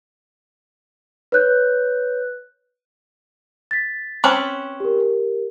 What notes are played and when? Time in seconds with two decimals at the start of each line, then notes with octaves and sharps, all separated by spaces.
1.32 B4 C#5 F#6 G6
3.71 A6 B6
4.24 C4 C#4 B4
4.80 G4 A#4